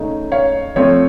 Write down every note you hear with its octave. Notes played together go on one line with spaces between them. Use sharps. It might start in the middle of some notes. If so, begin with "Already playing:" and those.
Already playing: C#3 A3 D#4 C#5
C#5 F5
F3 A3 C4 C#5